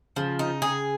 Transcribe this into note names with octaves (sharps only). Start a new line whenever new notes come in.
C#3 F3
D#4
G#4